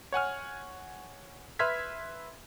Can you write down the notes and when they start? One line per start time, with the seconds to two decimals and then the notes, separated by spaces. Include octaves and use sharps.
0.12 C#5 F#5 G#5 F6
1.59 B4 E5 C6 F6 G#6 B6